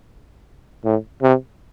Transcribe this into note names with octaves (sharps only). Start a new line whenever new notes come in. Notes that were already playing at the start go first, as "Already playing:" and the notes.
A2
C3